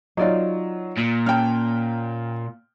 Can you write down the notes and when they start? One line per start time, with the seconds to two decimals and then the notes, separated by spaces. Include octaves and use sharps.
0.17 F#3 D#4 F4 D5 D#5
0.98 A#2
1.26 C#4 G5 A5 F6